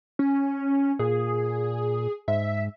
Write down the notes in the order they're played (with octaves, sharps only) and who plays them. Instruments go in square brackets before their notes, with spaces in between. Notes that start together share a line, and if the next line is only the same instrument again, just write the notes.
[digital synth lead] C#4
[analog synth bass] A#2 [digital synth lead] G#4
[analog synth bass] G#2 [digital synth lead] E5